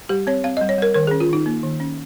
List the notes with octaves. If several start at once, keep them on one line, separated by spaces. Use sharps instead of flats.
G3 G4
C4 C#5
C4 F5
D#5
G3
C#5
G3 A#4
D#3 A#4
G#4
C#4
F4
D#3 D#4
A#3
D#3
C#4